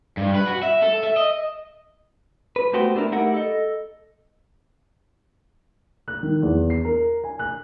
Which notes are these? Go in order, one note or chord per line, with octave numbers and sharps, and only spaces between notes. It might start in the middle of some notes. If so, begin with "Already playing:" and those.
G2
B4
F#4
E5
A4
E5
D#5
B4
A3 B3 F#4 G4 C5
A3 D4 E4 A#4
A3 D#4 E4 G4 A#4 F#5
A4 D#5
F#6
D#3
E2
C7
A#4
G#5
F#6